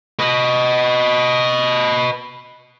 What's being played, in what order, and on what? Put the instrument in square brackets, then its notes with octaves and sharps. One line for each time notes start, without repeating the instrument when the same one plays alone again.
[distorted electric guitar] B4 D#5